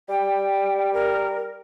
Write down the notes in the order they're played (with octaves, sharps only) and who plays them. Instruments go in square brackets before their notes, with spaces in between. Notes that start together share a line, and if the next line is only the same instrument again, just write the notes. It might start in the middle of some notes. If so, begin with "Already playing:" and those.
[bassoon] G3 [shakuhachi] G5
[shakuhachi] A#4